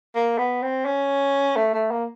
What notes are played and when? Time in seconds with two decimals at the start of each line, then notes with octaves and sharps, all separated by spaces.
0.15 A#3
0.38 B3
0.63 C4
0.85 C#4
1.56 A3
1.74 A3
1.91 A#3